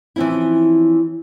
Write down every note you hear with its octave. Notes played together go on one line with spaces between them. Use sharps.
E3 F3 C4 C#4 E4